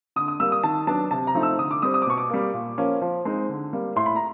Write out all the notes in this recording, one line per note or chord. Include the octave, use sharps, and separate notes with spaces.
D3 D#6
D#6
G3 A#3 E6
D#6
D#3 A5
F#3 B3 D4 A5
C3 A5
A#5
F3 A3 C4 D#4
E6
D3 D#6
D6
G3 C4 D#6
D#6
D6
B2 C#6
D6
G3 A#3
A#2
F3 A#3 C#4
F3
G#3 C4 D#4
D3
G3 A#3
A2 C6
B5
A#5